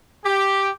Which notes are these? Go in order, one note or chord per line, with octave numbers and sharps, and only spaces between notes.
G4